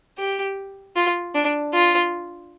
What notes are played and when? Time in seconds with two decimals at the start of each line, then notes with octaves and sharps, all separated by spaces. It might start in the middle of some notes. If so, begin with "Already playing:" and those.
0.18 G4
0.96 F4
1.35 D4
1.73 F4